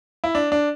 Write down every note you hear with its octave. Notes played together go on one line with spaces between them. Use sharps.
E4
D4
D4